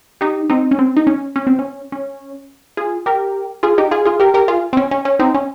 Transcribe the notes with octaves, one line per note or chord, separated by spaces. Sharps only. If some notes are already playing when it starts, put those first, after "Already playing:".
D#4 G4
C4 D#4
C#4
C4
D#4
C#4
C#4
C4
C#4
C#4
F4 G#4
G4 A#4
F4 G#4
D#4 G4
F4 G#4
F4 G#4
G4 A#4
G4 A#4
F4 G#4
C4
C#4
C#4
C#4
C4 D#4
C#4